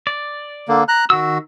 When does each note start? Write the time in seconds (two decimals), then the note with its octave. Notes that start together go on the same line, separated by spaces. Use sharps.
0.07 D5
0.68 D3 A#3
0.88 A#5 F#6
1.10 D#3 F#4 E6